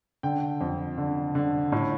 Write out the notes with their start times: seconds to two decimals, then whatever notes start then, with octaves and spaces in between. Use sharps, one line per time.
0.23 D3 G5
0.61 F2
0.98 D3
1.35 D3
1.72 A2